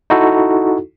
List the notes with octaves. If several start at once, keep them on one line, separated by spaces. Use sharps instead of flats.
D#4 E4 F#4 A4